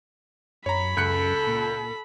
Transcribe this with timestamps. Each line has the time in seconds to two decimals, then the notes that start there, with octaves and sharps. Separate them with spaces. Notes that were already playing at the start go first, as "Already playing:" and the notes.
0.66 F#2 C#5 A#5 B5
0.97 C#2 F#2 A4 F#6 C#7
1.47 A#2